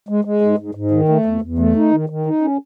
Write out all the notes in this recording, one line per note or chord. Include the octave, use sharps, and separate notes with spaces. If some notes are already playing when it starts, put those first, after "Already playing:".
G#3
G#3
G#2
G#2
G#2
D#3
A3
E2
E2
A3
D#4
D#3
D#3
D#4
C#4